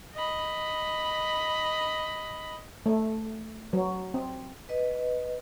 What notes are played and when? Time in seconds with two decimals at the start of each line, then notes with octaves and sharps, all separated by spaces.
0.14 D#5 B5
2.86 A3
3.73 F#3
4.14 C4
4.69 B4 D#5